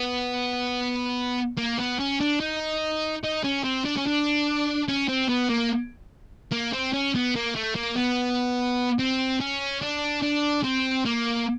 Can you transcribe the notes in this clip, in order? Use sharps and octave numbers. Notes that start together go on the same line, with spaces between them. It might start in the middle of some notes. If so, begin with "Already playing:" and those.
Already playing: B3
A#3
B3
C#4
D4
D#4
D#4
C#4
C4
D4
C#4
D4
C#4
C4
B3
A#3
A#3
C4
C#4
B3
A#3
A3
A#3
B3
C4
C#4
D4
D4
C4
A#3